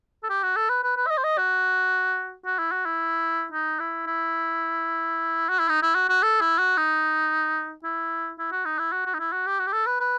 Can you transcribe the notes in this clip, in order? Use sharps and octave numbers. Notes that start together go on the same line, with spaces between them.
A4
G4
F#4
A4
B4
B4
B4
E5
D#5
C5
D#5
F#4
F#4
E4
F#4
E4
D#4
E4
E4
F#4
E4
D#4
E4
F#4
F#4
A4
E4
F#4
D#4
E4
E4
F#4
D#4
E4
F#4
F#4
D#4
E4
F#4
G4
F#4
G4
A4
B4
B4